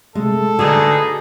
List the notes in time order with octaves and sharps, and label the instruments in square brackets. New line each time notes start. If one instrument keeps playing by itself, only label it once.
[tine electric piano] C3 A3 [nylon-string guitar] G#3 [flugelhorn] A4
[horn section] B2 D#4 G#4 [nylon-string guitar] D3 A3 [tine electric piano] F#4